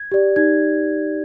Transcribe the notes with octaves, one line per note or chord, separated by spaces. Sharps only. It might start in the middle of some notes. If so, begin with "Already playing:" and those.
Already playing: G#6
G4 D5
D#4 G#6